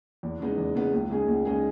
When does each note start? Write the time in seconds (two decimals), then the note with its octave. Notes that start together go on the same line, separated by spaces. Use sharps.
0.23 E2
0.40 C#3 G#3 B3 D#4
0.58 E2
0.75 C#3 G#3 B3 D#4
0.93 C#2
1.10 C#3 G#3 D#4 G#4
1.28 C#2
1.45 C#3 G#3 D#4 G#4